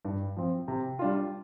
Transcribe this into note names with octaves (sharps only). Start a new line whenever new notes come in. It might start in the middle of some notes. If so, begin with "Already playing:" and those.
G2
F3 C4
C3
G3 D4 F4